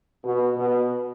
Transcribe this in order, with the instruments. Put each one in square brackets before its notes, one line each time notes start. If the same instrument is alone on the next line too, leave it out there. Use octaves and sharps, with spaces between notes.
[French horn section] B2
B2